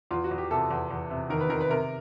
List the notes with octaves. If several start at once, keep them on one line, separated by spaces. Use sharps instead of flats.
E2 F4
F#4
E2
G4
C3 A4
E2
E2
C3
D#3 A#4
B4
D#3 A#4
B4
C3 A#4